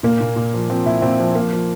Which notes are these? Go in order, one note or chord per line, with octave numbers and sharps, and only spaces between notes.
A#2 A#3
A#2
A#2
F3
F3 C4
A#2 E4
A#2 C4
F3
F3 A#3
F3